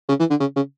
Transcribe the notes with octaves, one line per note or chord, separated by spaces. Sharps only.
C#3
E3
D3
C#3
C#3